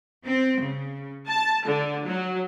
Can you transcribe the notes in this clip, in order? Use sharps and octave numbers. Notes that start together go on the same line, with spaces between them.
C4
C#3
A5
D3
F#3